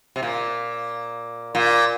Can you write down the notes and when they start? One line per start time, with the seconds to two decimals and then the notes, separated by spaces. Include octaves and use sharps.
0.16 C3
0.23 A#2
1.55 A#2